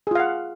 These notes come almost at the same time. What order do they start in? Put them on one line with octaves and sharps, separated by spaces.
G#4 F4 F5 F#5